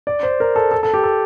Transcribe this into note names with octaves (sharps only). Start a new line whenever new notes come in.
D5
C5
A#4
A4
A4
A4
G4
A4